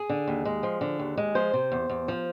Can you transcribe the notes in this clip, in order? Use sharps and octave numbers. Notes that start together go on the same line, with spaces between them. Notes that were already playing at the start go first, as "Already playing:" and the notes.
Already playing: G#4
D3
D#2
G#3
F3
D3
D#2
G#3
F3 C5
C3
E2
E2
F3